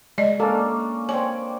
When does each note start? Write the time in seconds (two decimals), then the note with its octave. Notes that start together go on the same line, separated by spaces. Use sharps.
0.18 G#3 D5 D#5
0.40 A#3 C#4 D4 A4
1.09 C4 C#5 D5 G#5 D6